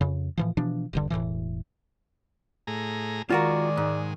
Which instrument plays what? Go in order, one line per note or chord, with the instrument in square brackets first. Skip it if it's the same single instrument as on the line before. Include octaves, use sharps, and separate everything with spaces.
[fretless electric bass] F2 C#3
A2 E3 F3
B2 E3 F3 D4
D#1 G2 D3
E1 F#2 A2 E3
[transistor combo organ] A2 G#4 A#5
[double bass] D#3 [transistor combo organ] G#3 [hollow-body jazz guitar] F4 F#4 A#4 [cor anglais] D5
[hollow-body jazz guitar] G#2